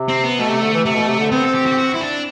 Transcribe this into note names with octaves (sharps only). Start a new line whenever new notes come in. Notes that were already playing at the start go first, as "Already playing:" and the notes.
Already playing: C3
C4
B3
B2 A3
C3
D3
E3
C3 A3
B2
C3
D3
B3 C4
A4
G4
F#4
G4
F#4
E4
D4